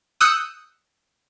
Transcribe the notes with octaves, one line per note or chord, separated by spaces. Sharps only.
D#6 E6 F#6 G6 C#7